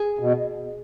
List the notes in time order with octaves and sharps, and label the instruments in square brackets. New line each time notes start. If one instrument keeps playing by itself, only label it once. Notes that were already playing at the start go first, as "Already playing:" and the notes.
Already playing: [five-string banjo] G#4
[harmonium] B2